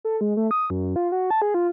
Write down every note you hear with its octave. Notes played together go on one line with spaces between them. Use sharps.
A4
G#3
A3
D#6
F#2
F4
F#4
A5
G#4
F4